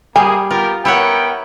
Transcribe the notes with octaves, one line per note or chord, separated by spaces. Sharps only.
G3 A#3 G#4 G#5
B3 F4 G4 A#4
B3 E4 A#4 C#5 F#5 G5